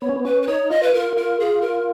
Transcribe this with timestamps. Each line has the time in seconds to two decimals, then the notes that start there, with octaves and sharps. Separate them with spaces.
0.02 B3 C#5
0.09 C#4
0.16 B3
0.24 C#4 B4
0.42 B4
0.47 D#4 C#5
0.70 F4 D#5
0.83 B4
0.93 F4 A#4
1.17 F4 A#4
1.40 G#4
1.62 A#4